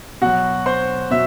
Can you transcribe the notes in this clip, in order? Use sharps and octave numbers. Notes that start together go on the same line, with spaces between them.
B2 F#3 F#4 F#5
C5 C6
B2 E5